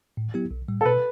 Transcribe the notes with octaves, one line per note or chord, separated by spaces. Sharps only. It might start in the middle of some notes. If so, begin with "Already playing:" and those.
A2
F#3 B3 E4 G4
B1
A2 G3
A4
B2 B4